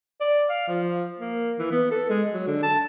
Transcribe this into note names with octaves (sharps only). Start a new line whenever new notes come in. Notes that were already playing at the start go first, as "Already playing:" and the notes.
D5
F5
F3
A#3
E3
B3
A4
G#3
F#3
D3
A5